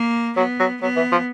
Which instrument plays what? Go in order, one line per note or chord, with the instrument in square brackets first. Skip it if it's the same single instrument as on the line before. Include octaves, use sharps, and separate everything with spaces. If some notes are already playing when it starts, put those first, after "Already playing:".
Already playing: [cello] A#3
[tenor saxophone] F#3 [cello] B3
[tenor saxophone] F#3
[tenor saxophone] F#3 [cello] B3
[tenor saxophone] E3
F3